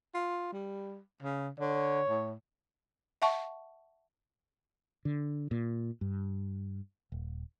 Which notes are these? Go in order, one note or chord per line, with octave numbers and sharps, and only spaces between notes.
F4
G3
C#3
D3 C#5
A2
E5 F#5 A5 C#6
D3
A#2
G2
D#1